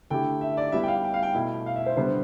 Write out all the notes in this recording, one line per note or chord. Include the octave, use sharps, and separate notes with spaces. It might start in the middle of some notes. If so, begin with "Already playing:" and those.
D3 A3 E4 G4 G5
E5
D5
G3 B3 E4 G4 E5
G5
F5
G5
F5
G5
B2 A3 E4
F5
E5
C5
D3 G3 B3 C5